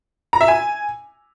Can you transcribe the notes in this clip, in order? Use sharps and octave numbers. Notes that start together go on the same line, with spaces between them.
A#5
E5
G#5